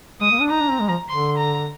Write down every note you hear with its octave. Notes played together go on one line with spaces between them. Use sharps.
G#3 D#6
A#3
D4
D#4 A#5
D4
C4
G#3
F3
D3 C6
A#5